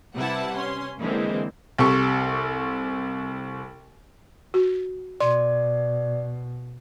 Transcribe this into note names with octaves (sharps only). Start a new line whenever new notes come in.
C3 G3 E4 B4 F#5 A5
C#4 C6
D3 E3 G#3 A#3 C4
C2 C3 G4 A4 C#6
F#4
B2 D5 C6